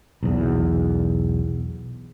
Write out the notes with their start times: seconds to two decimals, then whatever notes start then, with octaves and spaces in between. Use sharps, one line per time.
0.23 B1 E2